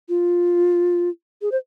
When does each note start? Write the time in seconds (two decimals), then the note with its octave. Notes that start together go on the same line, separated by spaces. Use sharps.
0.09 F4
1.42 G#4
1.52 C5